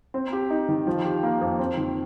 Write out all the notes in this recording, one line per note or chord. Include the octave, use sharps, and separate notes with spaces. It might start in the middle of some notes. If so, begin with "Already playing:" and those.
C4
G4
D#4
D#3
F3
G4
A#3
F2
C4
D#3